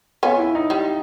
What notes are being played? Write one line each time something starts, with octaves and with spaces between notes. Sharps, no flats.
B3 C#4 F4
E4
D#4
G3